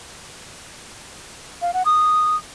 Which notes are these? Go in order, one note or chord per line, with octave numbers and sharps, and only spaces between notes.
F5
F#5
D#6